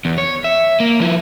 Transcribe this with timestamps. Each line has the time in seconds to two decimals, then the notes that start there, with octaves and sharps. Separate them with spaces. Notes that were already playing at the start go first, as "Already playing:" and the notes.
0.05 E2
0.18 C#5
0.44 E5
0.80 A#3
1.00 F3 E4